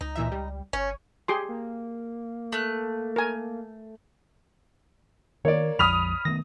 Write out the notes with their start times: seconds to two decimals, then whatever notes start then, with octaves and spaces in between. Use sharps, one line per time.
0.01 C#2 D#4
0.16 A#2 E3 E5
0.32 G3
0.73 G1 C#4 C#5
1.28 G4 G#4 C6
1.49 A#3
2.52 A3 F#6
3.16 A#4 G#5
5.45 D#3 A#3 C#5 D5
5.79 A#1 F2 F3 B5 D#6 F6 F7
6.25 D#3 A3 B3 A#6